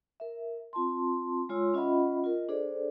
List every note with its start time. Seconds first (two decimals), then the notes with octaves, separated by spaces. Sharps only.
0.20 A#4 E5
0.73 C4 F4 A5 C6
1.49 G#3 F4 C#5 C6 E6
1.74 C#4 F4 D#5 E5 F#5 B5
2.24 F4 A#4 D#5
2.49 D4 G#4 A4 C5 D5